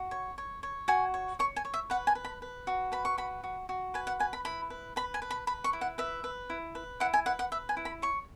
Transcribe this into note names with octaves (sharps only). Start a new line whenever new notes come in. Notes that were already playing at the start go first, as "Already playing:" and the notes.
Already playing: F#4
C#5
C#5
C#5
F#4 G#5
C#5
C#5 C#6
G#5
C#5
E5
B4 F#5
G#5
B4
B5
B4
F#4
B4 B5
C#6
F#4 B5
F#4
F#4
B4 G#5
F#5
B4 G#5
B5
E4 B5
B4
B4 B5
G#5
B4
B5
B4 B5
C#6
E4
F#5
B4 E5
B4
E4
B4
E4 F#5
G#5
B4 F#5
F#5
B4 E5
G#5
E4
B5
C#5 C#6